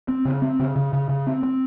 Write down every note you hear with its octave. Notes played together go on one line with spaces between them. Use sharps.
C4
C#3
C4
C#3
C#3
C#3
C#3
C4
C4